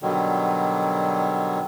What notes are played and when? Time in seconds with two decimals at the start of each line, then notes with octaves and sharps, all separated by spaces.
0.02 B2 D3 D#3 F#3 G3